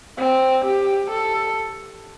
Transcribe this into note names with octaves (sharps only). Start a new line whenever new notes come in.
C4
G4
A4